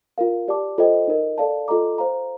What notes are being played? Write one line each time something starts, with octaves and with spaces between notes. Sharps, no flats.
F4 A#4 F5
G4 D5 A5 D6
F4 A4 C5 D#5 G5
D#4 A#4 D#5
A4 D5 F5 A5
F4 A4 D#5 A#5 D6
C5 F5 A#5